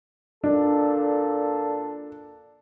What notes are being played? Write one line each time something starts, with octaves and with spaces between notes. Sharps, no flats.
A#2 D4 A4